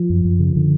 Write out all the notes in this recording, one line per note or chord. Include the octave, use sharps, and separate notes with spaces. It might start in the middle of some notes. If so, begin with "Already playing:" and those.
Already playing: F3
F#2
F#2
C#3
D3